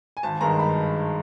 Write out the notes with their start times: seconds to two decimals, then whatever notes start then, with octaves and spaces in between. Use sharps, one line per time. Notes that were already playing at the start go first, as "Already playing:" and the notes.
0.17 G#5
0.23 G#1 A5
0.41 G2 D#3 G#3 A#5
0.59 B5